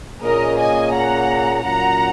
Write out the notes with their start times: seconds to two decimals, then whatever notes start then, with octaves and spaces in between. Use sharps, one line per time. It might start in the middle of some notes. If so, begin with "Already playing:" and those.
0.22 A#2 A#3 C#4 G#4 A#4 D#5
0.58 D#5 G#5
0.93 F#5 A#5
1.63 A#2 F#3 A#3 C#4 F#5 A#5